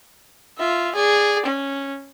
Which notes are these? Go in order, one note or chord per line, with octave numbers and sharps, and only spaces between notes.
F4 E5
G#4 D5
C#4